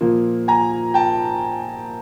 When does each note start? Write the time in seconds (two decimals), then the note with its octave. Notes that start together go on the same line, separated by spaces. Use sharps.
0.01 A#2 F3 A#3
0.48 G#5 A#5
0.94 G5 A5